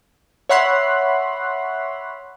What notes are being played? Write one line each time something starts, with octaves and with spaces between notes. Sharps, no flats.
C#5 E5 F#5 B5 C6 F#6